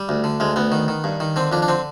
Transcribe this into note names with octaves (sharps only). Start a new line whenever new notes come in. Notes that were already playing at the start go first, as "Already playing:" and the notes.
Already playing: G3
D2
D3
D2 G#3
D2 B3
D#3
D#3
G2
D#3
D3 C4
F2 D4
D4
D3 C4